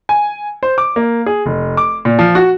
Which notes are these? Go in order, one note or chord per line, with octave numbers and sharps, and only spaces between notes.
G#5
C5
D6
A#3
G#4
F1
D6
A#2
F3
F#4